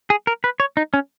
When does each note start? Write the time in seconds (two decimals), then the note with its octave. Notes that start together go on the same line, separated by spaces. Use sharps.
0.10 G#4
0.27 A#4
0.44 B4
0.60 C#5
0.77 D#4
0.94 C#4